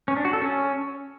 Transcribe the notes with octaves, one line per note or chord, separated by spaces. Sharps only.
C#4
D4
F#4
A4
C#4